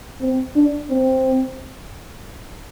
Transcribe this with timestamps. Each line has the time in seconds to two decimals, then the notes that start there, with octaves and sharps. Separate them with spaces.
0.21 C4
0.56 D4
0.90 C4